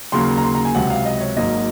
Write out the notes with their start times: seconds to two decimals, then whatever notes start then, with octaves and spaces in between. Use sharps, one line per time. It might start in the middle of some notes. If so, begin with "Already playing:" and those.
0.12 D#2 C#3 F#3 A#3 C6
0.38 A#5
0.44 C6
0.55 A#5
0.65 G#5
0.75 C#2 C3 F#3 F#5
0.90 F5
1.06 D#5
1.21 C#5
1.37 G#1 G#2 F#3 A#3 D#5